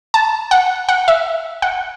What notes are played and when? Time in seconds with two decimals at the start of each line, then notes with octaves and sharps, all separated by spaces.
0.14 A5
0.51 F#5
0.89 F#5
1.08 E5
1.62 F#5